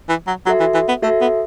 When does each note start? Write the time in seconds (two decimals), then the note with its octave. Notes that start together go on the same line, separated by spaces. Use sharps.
0.09 E3
0.27 F#3
0.46 F#3 F#4 A4 E5
0.60 E3
0.74 E3
0.88 B3
1.02 A3 F#4 A4 E5
1.21 B3